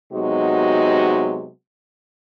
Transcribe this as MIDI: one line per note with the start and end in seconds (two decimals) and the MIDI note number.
0.13 1.48 48
0.13 1.48 54
0.13 1.48 56
0.13 1.48 59
0.13 1.48 63
0.13 1.48 66